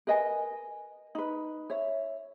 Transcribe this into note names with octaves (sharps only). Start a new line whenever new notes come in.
A#4 B4 D#5 G#5
D#4 B4
C#5 E5